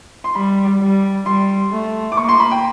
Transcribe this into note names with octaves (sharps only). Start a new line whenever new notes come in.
C6
G3 B5
G3
G3 C6
A3
D6
A#3 C#6
C6
B5
G5